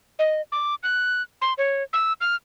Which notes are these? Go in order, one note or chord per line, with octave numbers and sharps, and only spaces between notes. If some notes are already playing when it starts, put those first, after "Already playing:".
D#5
D6
F#6
C6
C#5
E6
F6